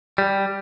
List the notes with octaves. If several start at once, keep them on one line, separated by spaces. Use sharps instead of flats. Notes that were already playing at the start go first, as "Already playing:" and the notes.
G3